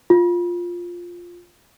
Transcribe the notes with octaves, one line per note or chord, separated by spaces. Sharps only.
F4